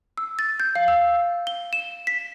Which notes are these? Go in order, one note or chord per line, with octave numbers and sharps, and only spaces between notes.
E6
A6
G6
F5
E6
G7
E7
B6